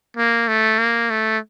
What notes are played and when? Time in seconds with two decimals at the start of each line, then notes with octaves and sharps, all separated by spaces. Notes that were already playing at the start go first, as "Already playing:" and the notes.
0.17 A#3
0.48 A3
0.79 A#3
1.10 A3